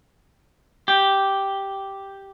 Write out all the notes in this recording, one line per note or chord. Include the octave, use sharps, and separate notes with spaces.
G4